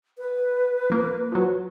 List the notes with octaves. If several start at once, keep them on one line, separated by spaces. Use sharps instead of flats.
B4
F3 A#3
F3 F#3